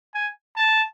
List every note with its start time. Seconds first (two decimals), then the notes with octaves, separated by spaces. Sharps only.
0.14 G#5
0.56 A5